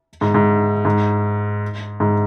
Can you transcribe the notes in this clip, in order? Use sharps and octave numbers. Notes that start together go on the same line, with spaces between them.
G#2
G#2
G#2
G#2